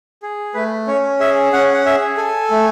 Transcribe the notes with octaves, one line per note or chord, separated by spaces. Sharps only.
G#4
A3 B4
C#4 C#5
G#4 E5
C#4 F#5
F#5
G#4 E5
A4 G#5
A3